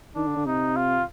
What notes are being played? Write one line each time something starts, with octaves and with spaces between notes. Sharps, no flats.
D#3 D4
D3
D3
C3 D#4
F4